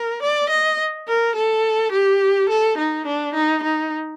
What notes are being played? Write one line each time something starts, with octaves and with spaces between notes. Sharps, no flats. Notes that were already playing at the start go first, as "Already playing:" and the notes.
Already playing: A#4
D5
D#5
A#4
A4
G4
A4
D#4
D4
D#4
D#4